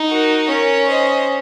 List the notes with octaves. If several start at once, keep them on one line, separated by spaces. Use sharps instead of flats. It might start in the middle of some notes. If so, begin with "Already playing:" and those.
Already playing: D#4
F#4 A#4
C#4 A#4 C#5
C5 D#5